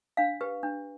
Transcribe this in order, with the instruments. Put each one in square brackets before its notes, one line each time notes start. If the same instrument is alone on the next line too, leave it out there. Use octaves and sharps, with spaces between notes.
[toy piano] D4 F5
G4 B4
D4